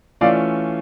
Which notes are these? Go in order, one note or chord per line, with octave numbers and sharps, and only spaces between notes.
E3 A3 C#4 F4 D5 F5